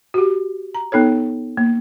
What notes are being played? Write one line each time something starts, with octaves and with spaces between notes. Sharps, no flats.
F#4 G4
A#5
B3 D#4 A4 C#5
A#3